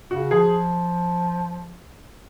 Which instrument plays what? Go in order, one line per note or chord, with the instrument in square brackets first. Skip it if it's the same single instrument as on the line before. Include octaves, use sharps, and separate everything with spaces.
[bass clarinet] C#3 [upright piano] F#4
[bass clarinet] F3 [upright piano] G#4